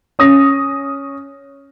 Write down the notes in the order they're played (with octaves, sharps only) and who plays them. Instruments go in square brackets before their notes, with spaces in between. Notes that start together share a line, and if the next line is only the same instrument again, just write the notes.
[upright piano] C#4 D#6 A#6